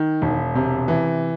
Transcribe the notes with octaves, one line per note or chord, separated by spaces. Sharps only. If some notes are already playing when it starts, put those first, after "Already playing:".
Already playing: D#3
E1
C3
E3